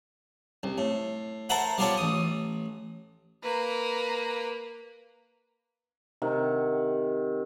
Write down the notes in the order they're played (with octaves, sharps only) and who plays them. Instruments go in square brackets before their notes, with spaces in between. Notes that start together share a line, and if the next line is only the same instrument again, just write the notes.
[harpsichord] C2
A2
A4 A#4 C5 E5 F#5 B5
G3 B3 F4 G4 A4 C#5
A1 D#6
[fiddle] A#3 B4
[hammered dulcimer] C3 D#3 F#5